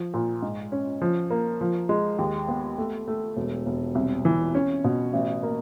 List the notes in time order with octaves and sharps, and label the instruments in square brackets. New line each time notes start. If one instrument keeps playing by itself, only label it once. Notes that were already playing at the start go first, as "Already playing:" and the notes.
Already playing: [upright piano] F3
A#2
G#2
C#4
F3
A#3
F3
G#3
D#2
B3
A3
A3
E1
E1
C2
E3
C#4
B2
A1
A#3